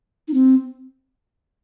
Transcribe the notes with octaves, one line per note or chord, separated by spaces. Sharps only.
D#4
C4